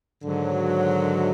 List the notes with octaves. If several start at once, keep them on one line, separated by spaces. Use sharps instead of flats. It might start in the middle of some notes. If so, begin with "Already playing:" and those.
G#2 D3 D#3 F#3